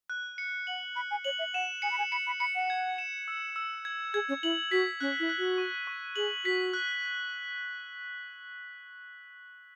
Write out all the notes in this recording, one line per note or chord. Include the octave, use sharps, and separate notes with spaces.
F#6
C#7
F#5 F#7
B5 F#6
G#5
C#5 F#7
E5
F#5 E7
G#5 C#7
B5
G#5
B5 C#7
B5
B5 C#7
F#5
G#6
E7
E6
E6
G#6
G#4 G#6
C#4
E4 F#7
F#4 B6
C#4 F#6
E4
F#6
F#4
C#6
C#6
G#4 F#7
F#4 B6
F#6